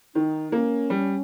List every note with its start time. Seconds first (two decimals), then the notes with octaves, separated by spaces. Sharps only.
0.15 D#3 D#4
0.52 A#3 C#4
0.90 G3